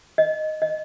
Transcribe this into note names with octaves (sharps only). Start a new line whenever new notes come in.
D#5
D#5